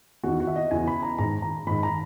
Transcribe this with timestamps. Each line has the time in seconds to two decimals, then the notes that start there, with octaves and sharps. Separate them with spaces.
0.24 E2 D#3 F#4
0.40 F#4
0.47 E5
0.56 D#5
0.71 E2 C#3 E3 G#5
0.87 B5
1.03 A#5
1.18 G#2 D#3 A#5
1.42 A#5
1.67 G#2 D#3 B5
1.83 A#5